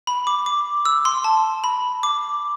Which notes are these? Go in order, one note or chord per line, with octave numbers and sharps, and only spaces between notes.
B5
D6
D6
E6
C6
A5
B5
D6